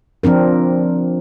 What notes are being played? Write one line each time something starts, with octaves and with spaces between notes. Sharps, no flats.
F3 C4 D4 A#4